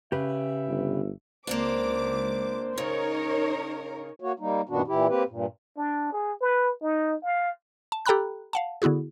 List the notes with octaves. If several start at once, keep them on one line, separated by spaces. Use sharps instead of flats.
C#3 G4 B4 E5
G1
C#2 A#3 C4 D4 C5 D6
C#3 D#4 A#4 C#5
A#3 F#4 C#5
G3 A#3 D#4
F#2 A#2 D#3 B3 D4 F#4
A#2 E3 E4 G4
A#3 C4 G4 B4
G2 A#2
D4
G#4
B4
D#4
F5
A5
G4 A4 G5 A#5 B5 F#6
F5 F#5 A5
D3 B3 E4 F#4 G#4